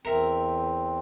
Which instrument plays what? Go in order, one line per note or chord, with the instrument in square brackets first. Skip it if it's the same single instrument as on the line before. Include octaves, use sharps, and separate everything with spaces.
[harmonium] E2 C4 [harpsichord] A#4 E5